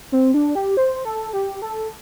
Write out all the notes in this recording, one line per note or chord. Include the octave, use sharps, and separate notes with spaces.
C4
D4
G4
C5
A4
G4
A4